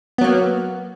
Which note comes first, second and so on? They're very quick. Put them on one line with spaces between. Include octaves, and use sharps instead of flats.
B3 F#3 A#3